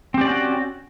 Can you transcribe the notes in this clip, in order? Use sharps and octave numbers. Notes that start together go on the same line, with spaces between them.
C4 C#4 F#4 G4 D5